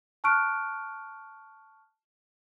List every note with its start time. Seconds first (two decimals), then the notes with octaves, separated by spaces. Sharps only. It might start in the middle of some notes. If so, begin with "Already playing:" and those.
0.24 A5 C#6 F6 F#6 D7